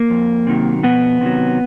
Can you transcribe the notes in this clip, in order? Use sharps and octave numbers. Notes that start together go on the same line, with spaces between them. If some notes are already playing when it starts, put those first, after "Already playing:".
Already playing: A#3
F2
C3 D#3 F#3
F2 B2 B3
C3 D#3 F#3